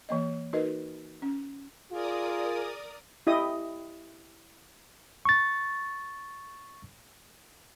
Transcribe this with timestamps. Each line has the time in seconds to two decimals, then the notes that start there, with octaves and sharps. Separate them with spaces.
0.09 E3 A#3 D#5
0.53 D#4 F#4 A#4 B4 D#5
1.22 C#4
1.91 F4 G#4 A#4 D5 D#6
3.27 E4 G4 D#5 D#6
5.25 C#6 A6